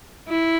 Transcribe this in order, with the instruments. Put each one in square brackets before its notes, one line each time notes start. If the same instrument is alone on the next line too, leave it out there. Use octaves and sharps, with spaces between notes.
[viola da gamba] E4